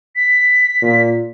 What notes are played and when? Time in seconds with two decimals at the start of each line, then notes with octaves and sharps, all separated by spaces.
0.16 B6
0.82 A#2